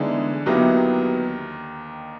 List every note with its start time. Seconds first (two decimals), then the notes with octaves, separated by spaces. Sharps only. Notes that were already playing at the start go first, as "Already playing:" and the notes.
Already playing: D2 D3 E3 G#3 B3 D#4
0.46 D#2 D#3 F#3 B3 E4 G4